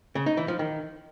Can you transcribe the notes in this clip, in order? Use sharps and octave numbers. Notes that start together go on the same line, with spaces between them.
C#3
D#4
E3
F3
D#3